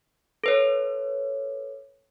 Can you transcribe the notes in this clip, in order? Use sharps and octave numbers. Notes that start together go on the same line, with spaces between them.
A4 B4 C#5